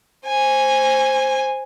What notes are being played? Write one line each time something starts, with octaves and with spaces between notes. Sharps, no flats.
C5 G#5